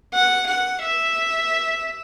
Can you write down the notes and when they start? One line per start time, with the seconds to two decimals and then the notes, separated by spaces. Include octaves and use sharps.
0.14 F#5
0.48 F#5
0.83 E5